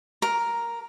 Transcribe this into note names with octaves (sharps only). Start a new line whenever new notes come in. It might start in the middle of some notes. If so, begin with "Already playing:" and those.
A#4